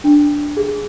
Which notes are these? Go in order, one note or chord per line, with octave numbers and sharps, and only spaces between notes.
D4
G#4